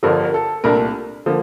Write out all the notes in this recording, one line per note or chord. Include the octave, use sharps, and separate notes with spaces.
G1 G2 D3 F3 A#4
A#4
A4
C2 A#2 A3 D4 A#4
D3 F3 A#3